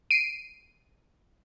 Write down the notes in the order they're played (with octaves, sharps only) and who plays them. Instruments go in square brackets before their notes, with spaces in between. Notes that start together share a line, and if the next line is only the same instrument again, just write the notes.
[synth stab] C7 D7 D#7